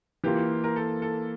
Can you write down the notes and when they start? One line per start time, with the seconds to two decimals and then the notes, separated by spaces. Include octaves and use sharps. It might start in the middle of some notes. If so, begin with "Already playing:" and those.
0.24 E3 A#3 F4 G4
0.64 A#4
0.76 A4
1.02 A4